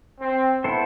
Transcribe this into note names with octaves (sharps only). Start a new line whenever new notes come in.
C4
B3 E4 A4 C5